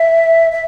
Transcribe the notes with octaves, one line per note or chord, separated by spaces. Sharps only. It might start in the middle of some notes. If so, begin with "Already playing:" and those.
Already playing: E5
E5